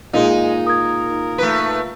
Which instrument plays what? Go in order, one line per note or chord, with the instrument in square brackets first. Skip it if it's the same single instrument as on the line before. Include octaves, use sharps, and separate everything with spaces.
[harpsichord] A#2 [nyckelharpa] G#3 G#4 [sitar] D#4 [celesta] D#5
[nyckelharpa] A#4 [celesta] D#6 G#6
[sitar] A3 B4